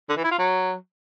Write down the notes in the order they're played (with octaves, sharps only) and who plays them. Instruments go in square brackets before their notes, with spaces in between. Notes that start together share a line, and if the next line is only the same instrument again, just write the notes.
[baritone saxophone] D3
E3
E4
F4
F#3